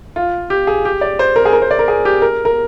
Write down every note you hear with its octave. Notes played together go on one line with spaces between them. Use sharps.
F4
G4
G#4
G4
D5
C5
A#4
G#4
A#4
C5
D5
A#4
G#4
G4
A#4
A#4